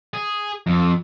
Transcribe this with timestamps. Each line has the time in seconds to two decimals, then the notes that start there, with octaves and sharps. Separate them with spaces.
0.14 G#4
0.67 F2